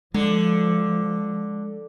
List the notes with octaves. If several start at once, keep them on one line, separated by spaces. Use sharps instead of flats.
D3 F3 G#3